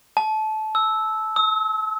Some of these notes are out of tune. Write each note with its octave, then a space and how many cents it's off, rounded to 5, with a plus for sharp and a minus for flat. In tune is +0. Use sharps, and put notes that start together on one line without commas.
A5 -20
E6 -10
E6 -40